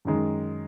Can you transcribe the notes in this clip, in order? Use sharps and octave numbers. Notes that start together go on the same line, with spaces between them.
F#2 D#3 G#3